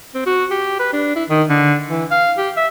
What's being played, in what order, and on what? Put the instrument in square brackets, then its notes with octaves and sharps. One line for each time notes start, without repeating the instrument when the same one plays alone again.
[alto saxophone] C4
F#4
G4
B4
D4
E4
D#3
D3
E3
F5
G4
E5